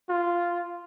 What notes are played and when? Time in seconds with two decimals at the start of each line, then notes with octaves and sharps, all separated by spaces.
0.09 F4